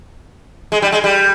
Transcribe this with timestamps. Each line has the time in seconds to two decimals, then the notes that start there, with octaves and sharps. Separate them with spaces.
0.72 G#3
0.82 G3
0.92 G#3
1.04 G3